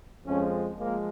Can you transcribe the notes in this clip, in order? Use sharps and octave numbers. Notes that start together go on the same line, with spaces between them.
F2 F3 G#3 C#4
F3 G#3 A#3